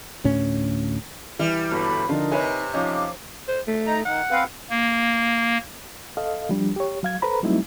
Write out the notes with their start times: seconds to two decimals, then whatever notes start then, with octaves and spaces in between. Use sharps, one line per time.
0.24 D2 A2 C#4
1.39 E3 G3
1.71 G1 F#4 A4 B4 B5
2.09 D3 F3 D4 D#4 F4 A#4
2.32 C3 B4 C#5 G#5
2.74 F3 C#4 D#4 F5 D6
3.48 C5
3.67 A3
3.86 D#4 A#5
4.05 D#3 F#5
4.31 C4 B4 F5
4.70 A#3
6.17 A4 D#5 F5
6.49 F3 G3 D4
6.76 G4 C#5
7.03 F#3 F5 G#6
7.22 A4 B4 C5 A#5 B5
7.43 F#3 G3 A3 C4 D#4 E4